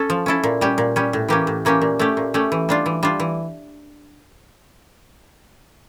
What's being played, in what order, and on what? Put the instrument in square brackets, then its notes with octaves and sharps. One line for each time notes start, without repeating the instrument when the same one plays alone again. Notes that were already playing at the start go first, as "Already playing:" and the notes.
Already playing: [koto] C#4 A4
F3
C#4 E4 A4
A#2
G3 C#4 G4
A#2
G3 C#4 G4
A2
E3 A#3 C#4 G4
A2
E3 A#3 C#4 G4
A#2
A3 C#4 G4
A#2
A3 C#4 G4
E3
G3 D4 F4
E3
G3 D4 F4
E3